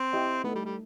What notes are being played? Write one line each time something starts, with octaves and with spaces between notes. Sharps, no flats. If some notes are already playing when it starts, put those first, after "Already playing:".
Already playing: C4
E4 G4 D#5 G5
A3 B3 D#4 A4
G3
G3